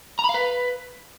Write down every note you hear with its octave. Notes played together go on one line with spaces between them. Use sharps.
A#5
B5
F5
B4